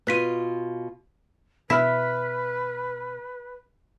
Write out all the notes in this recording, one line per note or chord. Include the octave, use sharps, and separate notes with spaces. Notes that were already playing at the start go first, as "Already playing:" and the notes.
B2 F4 B4 B6 D#7
B2 E4 B4 F6 B6